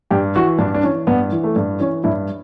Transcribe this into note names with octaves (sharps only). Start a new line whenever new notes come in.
G2 G4
E3 F#4
G2 D4
D4
E3 C#4
G2 B3
E3
A3
G2
E3 C#4
G2 E4